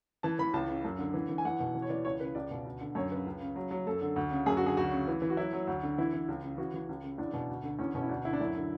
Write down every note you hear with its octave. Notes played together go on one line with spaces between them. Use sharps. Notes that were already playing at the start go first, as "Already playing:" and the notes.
E3 A5
E3 B5
C#2 A5
C#3
F#2
D3
E3
E3
G#5
E2 F#5
B2
E3
C#5
E3 D5
C#2 C#5
C#3 B4
C#2 D5
B2
D2
D3
F#2 C#5
C#3 B4
C#2
C#3
F#3
F#3
F#2 A4
D3
D2
C#3
F#2 G#4
F#4
D3 G#4
D2 F#4
C#3
E3
E3
F#4
F#3 E4
F#3
D2
D3
E3 E4
E3
C#2
C#3
E3 F#4
E3
C#2
C#3
E2 D4
B2
D2
D3
E2 C#4
B2 C#4
E4
D2 D4
D3 E4
D4
F#2 E4
D3